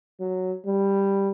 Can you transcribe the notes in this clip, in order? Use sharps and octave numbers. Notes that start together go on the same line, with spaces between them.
F#3
G3